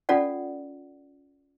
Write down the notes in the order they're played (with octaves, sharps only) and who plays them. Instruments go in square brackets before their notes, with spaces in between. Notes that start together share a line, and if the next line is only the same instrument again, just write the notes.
[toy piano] C#4 F4 A4 D5 F#5